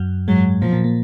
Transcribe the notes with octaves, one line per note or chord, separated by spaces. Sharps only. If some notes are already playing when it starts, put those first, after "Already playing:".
Already playing: F#2 F#3
G#2 F#3 G#3
A#2 F3 A#3
A#2 A#3
A#2 A#3